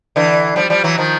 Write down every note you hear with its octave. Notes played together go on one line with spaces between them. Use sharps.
D3 E3
F3 G3
F3 G3
E3 F#3
D#3 F3